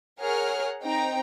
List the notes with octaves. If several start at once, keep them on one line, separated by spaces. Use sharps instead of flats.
G#4 A#4 C#5 F#5 F6
C4 D#4 G5 A#5